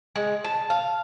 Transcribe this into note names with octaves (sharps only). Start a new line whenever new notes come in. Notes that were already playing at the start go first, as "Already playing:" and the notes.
G#3
A5
F5